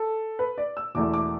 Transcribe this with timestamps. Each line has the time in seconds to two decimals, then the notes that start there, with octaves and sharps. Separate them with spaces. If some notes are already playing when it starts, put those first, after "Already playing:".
Already playing: A4
0.39 B4
0.58 D5
0.77 E6
0.95 E1 E2 E3 A3 D6
1.14 D6